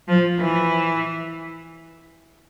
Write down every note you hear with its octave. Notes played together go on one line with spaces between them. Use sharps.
F3
E3